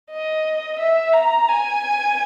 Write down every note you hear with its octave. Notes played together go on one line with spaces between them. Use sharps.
D#5
E5
A#5
G#5